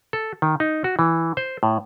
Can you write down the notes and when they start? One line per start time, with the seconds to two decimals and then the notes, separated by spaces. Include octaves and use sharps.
0.13 A4
0.42 D#3
0.60 D#4
0.84 F#4
0.99 E3
1.37 C5
1.63 A2